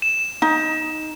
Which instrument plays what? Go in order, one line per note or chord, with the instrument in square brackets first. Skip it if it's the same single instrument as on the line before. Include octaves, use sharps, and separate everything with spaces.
[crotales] E7
[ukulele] D#4